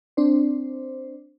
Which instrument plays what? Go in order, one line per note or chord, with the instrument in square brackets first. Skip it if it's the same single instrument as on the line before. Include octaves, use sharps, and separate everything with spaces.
[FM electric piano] C4 D4 C5